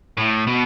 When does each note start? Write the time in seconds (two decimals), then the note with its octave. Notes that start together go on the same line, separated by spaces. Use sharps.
0.17 A2
0.47 B2